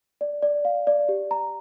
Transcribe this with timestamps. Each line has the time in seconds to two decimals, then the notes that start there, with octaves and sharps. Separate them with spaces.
0.21 D5
0.42 D5
0.65 F5
0.87 D5
1.09 G4
1.31 A#5